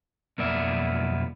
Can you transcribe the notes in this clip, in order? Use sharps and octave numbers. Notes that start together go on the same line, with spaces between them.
B1 F2 A#3 B3 D5 E5